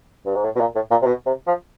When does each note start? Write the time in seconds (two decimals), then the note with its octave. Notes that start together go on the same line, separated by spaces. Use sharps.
0.26 G2
0.35 G#2
0.44 A2
0.56 B2
0.61 A#2
0.76 A2
0.91 A#2
1.02 C3
1.06 B2
1.26 C3
1.47 F3